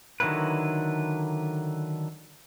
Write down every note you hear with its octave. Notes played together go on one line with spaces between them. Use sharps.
D3 D#3 F#3 A#3 E4 B4